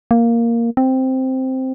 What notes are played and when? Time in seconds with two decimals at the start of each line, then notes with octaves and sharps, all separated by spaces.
0.11 A#3
0.77 C4